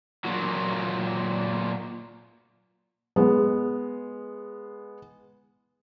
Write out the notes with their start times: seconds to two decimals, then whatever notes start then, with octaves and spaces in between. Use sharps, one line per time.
0.25 A#2 F#3
3.16 G#3 B3